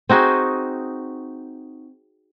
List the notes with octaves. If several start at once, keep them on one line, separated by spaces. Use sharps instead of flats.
C4 D#4 F#4 G#4